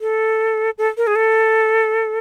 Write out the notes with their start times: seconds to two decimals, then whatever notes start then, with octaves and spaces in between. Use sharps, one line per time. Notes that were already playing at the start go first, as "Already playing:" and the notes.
0.01 A4
0.78 A4
0.97 A#4
1.07 G#4
1.16 A4